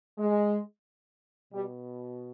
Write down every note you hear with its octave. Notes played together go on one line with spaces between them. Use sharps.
G#3
B2 G3